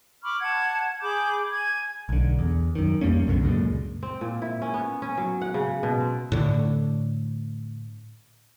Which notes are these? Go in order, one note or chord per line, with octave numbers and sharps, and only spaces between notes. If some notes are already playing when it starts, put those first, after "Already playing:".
B5 C#6 D6 F6
F#5 A5 G#6
G#4 B5 D6 G6
G#5 G#6
B1 D3
E2
F#2 D#3
F2 G3 A#3 C#4
C2 F#2 B2 D3
C#2 F#2 A#2 G#3
C4
A#2
E4
C#4
B3
C#4
F#3
F#5
C#3
B2
C4
A2 D3